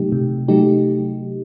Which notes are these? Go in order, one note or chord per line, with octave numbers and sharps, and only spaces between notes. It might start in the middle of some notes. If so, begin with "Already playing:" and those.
Already playing: C3 F#3 A3 D#4 G4
C3
F#3 A3 D#4 G4